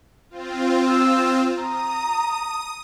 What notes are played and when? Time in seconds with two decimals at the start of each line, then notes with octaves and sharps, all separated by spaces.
0.30 C4 F4
0.88 E6
1.59 A#5 D#6